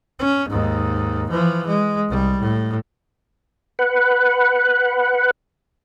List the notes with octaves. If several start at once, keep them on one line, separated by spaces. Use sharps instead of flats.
C#4
D#2 G#2
E3 F3
G#3
C2 G3
A2
B4 F#5